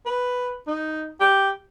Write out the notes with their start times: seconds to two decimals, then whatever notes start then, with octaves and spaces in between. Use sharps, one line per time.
0.06 B4
0.67 D#4
1.21 G4